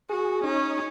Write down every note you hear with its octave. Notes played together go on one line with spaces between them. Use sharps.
F#4 G#4
C#4 D#4